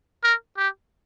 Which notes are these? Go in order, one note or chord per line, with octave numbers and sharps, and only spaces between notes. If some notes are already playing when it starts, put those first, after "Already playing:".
A#4
G4